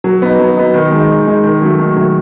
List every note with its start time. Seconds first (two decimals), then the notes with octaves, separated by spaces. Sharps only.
0.04 F#3
0.22 B3 D#4
0.40 F#3
0.57 B3 D#4
0.74 D#3
0.92 G#3 D#4
1.09 D#3
1.27 G#3 D#4
1.44 D#3
1.62 F#3 A3
1.79 D#3
1.97 F#3 A3